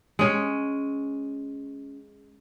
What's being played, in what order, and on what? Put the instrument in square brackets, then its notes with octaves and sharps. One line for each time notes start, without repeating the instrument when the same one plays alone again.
[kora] G#3 C#4